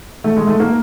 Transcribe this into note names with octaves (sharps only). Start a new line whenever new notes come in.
A3
G#3
A3
A#3